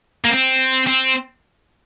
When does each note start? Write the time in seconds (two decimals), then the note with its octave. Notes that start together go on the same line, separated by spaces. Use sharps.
0.24 A#3
0.30 C4
0.87 C4